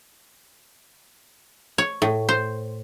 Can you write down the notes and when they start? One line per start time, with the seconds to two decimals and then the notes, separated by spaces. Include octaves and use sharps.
1.78 C#5
2.02 A2
2.29 C5